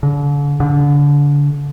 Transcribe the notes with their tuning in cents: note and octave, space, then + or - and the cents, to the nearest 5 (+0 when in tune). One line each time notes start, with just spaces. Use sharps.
D3 -40
D3 -30